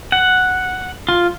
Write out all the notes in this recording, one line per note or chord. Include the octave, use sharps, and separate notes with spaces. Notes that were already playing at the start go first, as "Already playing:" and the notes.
F#5
F4